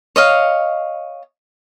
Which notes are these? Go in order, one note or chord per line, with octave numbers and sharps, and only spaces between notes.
C#5 D#5 F5